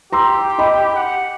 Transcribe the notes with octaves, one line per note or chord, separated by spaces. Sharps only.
G4 A#5 C6 E6
D#5 B5
F#5